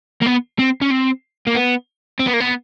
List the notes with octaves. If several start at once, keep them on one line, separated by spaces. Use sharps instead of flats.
A#3
B3
C4
C#4
C4
A#3
B3
C4
B3
A#3
B3